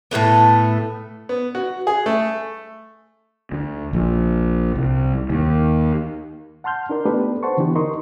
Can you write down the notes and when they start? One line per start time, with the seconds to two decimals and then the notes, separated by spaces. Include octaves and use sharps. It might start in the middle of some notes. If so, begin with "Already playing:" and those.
0.11 A2 D#3 A3 B3
1.29 B3
1.55 F#4
1.87 G#4
2.06 A3
3.52 D2
3.93 A#1
4.75 C2
5.30 D#2
6.64 F#5 A5 C6 F6 G6
6.90 D4 D#4 A#4 D5 C6
7.05 A3 B3 D4 G4 A4 B4
7.43 B4 C5 F#5 A5 C6 C#6
7.57 D3 E3 B3 D4 G4
7.75 D#4 A#4 D#5 C6 C#6